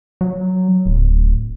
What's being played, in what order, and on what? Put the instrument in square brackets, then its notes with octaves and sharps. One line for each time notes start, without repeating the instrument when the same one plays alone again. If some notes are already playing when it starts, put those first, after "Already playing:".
[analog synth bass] F#3
D1